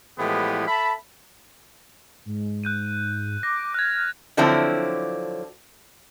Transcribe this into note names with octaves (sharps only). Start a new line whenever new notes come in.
A2 E3 F3 G#3 B3 G4
A4 E5 A5 B5
G#2
F#6 G6 D#7
D6 A#6
F6 F#6 G#6
D3 F3 F#3 C4 D4 E4